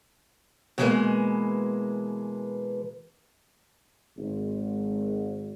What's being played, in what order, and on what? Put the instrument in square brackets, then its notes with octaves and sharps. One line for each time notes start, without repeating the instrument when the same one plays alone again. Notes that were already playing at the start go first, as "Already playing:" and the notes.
[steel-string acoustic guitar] B2 E3 F3 G3 G#3 A#3
[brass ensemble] G#1